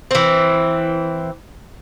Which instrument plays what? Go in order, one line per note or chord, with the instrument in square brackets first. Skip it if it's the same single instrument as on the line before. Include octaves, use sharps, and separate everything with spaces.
[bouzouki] E3 C4